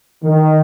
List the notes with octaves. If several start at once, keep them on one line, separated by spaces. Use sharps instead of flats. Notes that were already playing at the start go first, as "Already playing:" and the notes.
D#3